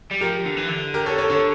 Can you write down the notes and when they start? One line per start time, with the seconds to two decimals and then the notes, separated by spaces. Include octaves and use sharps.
0.11 G3
0.21 F3 G4 A#4
0.45 D3
0.57 E3
0.69 D3
0.94 G4 A#4
1.06 A4 C#5
1.18 A4 C#5
1.30 D3 A4 C#5